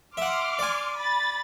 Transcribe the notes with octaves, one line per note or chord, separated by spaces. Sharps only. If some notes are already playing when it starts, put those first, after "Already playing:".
E5 F#5 C6 D6 F6
D5 G#5
B5 A6